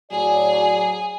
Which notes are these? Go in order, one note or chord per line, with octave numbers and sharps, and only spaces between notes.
A2 F#3 G#4 D5